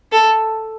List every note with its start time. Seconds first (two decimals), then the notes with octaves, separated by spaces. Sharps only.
0.12 A4